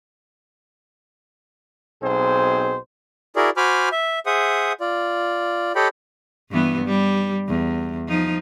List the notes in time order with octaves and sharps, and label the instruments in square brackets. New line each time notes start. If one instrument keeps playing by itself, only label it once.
[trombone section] B1 B2 C4 G#4 C5
[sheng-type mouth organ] E4 F#4 G#4 A#4 D5
F#4 C5 G#5 B5 D6 F6
E5
G#4 C5 E5 F#5 D#6
F4 D5
G4 A4 C#5 D#5 G5 B5
[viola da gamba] G2 E3 B3
G3
E2
F3 D#4